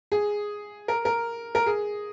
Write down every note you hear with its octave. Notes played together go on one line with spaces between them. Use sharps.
G#4
A#4
A#4
A#4
G#4